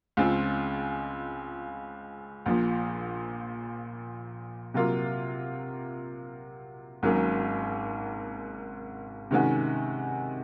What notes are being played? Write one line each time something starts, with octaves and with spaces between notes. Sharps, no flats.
C#2 C#3 G#3 C4 F4
A#1 A#2 F3
C3 F#3 A#3 F4
G#1 G#2 F#3 A#3 C#4
C3 D#3 G#3 C#4 F#4